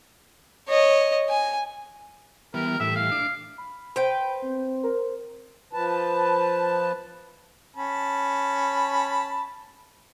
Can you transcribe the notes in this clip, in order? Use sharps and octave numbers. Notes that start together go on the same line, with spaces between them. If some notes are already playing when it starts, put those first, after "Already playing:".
C#5 D#5
G#5
E3 G3 B3 A#4
A2 E3 G3 E5
F5
D4 D6
B5
B4 C5 G5
C4
A#4
F3 B4 A5
C#4 A5 B5